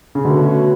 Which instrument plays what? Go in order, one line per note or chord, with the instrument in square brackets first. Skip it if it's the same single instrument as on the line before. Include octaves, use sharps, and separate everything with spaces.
[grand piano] C#3
[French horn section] B2 A3 C#4 F#4 A4 [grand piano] D3